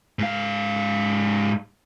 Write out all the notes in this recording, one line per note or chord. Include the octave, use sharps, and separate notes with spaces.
G#2 F5